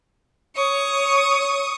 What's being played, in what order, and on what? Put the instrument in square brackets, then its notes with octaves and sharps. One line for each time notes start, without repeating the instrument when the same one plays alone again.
[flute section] C#5 [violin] C#6 D#6